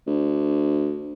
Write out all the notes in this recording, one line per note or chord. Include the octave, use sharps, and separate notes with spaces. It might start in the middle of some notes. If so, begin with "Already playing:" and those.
D2